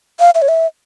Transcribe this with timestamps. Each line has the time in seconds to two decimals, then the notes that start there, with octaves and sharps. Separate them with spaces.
0.20 F5
0.35 E5
0.42 C#5
0.48 E5